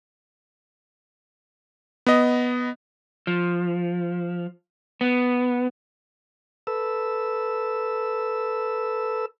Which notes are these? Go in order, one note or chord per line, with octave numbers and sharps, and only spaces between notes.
B3 D#5
F3
B3
A4 B4 E6